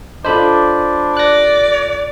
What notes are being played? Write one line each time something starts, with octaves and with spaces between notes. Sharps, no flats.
D4 F4 A4 C5 D#5 B5
D5 F#6 A#6